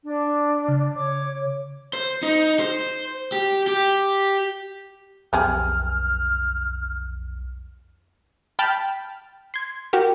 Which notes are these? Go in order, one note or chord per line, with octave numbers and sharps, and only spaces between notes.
D4
C#3
C#5 D6
C5
D#4
C5
G4
G4
B1 F2 B3 G4 G#4 F6
G5 A5 B5 F6 A6
C6 G#6
F#4 G4 A#4